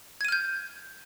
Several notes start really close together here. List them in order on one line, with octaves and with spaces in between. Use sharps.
G#6 D#7 F6 G6